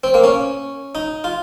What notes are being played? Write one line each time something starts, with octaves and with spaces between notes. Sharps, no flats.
C4
A#3
C#4
D#4
F4